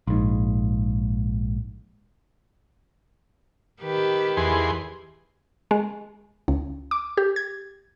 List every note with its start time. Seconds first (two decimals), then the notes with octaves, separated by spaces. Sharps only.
0.07 A#1 G#2
3.82 D#3 G4 B4
4.37 E2 G#4 C6
5.71 G#3
6.48 C#2
6.91 D6
7.17 G4
7.36 G#6